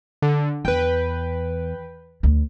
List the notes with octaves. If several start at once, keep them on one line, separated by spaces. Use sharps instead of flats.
D3
E2 B4 G5
D2